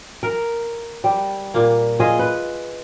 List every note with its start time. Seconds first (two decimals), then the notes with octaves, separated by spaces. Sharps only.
0.23 A#4
1.04 G3
1.54 A#2 A#3
2.00 F4 G#4 D#5
2.19 B4